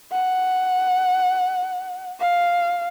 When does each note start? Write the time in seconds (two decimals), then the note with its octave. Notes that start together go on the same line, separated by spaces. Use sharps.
0.12 F#5
2.20 F5